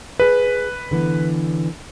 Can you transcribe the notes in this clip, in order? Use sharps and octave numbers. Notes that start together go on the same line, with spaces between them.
G#4 B4 D#5
D3 E3 B3